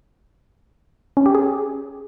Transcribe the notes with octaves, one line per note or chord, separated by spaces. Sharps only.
C#4
G4
G#4